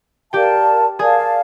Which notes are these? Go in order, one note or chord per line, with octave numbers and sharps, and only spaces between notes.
G4 A#4 D5 F5 G5 A5
G#4 A#4 D5 F5 G#5 A5